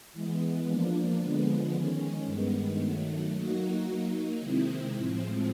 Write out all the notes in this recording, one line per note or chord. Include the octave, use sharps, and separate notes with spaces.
E3 G#3 B3
F3 A#3 D4
D3 F3 G#3 B3
D#3 G#3 C#4
G2 D#3 G#3 B3
D#3 F#3 A3
F#3 A#3 D#4 F#4
F#3 A#3 D#4
C3 D#3 G#3 C4 E4
A2 F3 G#3 C4